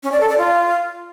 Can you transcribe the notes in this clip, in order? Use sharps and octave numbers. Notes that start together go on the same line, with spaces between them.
C#4
D5
A4
D5
F4